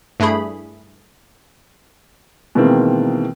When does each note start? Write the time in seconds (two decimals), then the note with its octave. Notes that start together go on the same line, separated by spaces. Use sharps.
0.20 G2 A3 D4 E4 G#4 B5
2.55 B2 D#3 E3 G#3 A#3 C4